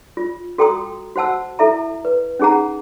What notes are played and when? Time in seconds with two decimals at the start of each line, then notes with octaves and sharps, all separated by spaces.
0.17 F4
0.58 F#4 A4 G5 A#5 C6 D#6
1.16 F#4 C5 F#5 A5 E6
1.59 E4 A4 E5 A#5
2.05 B4
2.39 C#4 D#4 G#4 F#5 A#5